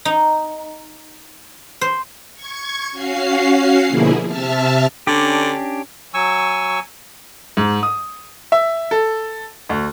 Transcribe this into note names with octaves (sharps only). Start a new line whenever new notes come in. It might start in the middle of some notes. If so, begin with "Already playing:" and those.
D#4
C5
C#6 G#6
C#4 F#4 F5 C7
B2 D3 F3 A#3 E4 G#4
C3 E5 A5 F6
D3 C#4 D4 G4
F#3 G#5 C#6 E6
G#2
D#6
E5
A4
D2